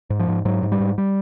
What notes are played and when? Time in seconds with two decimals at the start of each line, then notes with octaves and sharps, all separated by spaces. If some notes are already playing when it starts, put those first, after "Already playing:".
0.10 G#2
0.19 F3
0.28 G#2
0.45 G#2 F#3
0.63 G#2
0.72 G3
0.80 G#2
0.98 G3